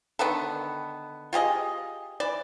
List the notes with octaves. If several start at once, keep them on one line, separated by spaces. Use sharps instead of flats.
D3 D#3 B3 A4
F4 G4 G#4 D#5
E3 D5